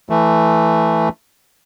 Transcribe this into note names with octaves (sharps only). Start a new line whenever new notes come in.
E3 A3